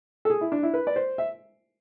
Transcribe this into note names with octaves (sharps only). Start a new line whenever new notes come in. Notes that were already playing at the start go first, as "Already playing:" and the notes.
A4
G#4
E4
D4
E4
B4
D5
C5
E5